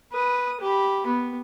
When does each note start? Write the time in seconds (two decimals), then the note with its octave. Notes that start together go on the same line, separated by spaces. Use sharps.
0.12 B4 D#6
0.61 G4 B5
1.06 B3